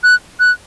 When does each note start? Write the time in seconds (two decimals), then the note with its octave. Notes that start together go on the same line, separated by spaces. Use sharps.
0.04 F#6
0.40 F#6